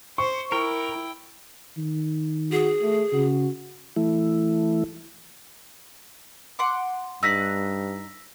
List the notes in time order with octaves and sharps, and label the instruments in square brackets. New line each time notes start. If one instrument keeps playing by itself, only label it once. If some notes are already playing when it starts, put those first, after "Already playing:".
[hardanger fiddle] C5 [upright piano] C#6
[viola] E4 [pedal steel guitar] A#4 [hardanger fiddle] G5
[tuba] D#3
[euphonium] F#4 [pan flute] G#4
[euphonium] A3
[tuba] C#3 [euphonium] F#4
[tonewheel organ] E3 A3 E4
[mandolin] F#5 C6 D6
[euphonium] G2 [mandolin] D#4 F#6 [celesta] E6 A#6 B6